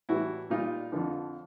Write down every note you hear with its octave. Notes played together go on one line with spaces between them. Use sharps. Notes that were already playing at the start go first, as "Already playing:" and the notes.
A2 E3 G3 E4 F#4
A#2 G3 D#4 F4
F2 D3 F3